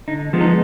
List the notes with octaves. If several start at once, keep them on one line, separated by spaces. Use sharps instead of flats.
D3 D#4
F3 G#3 B3
D#4